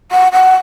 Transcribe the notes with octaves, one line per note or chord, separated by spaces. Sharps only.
F#5
F#5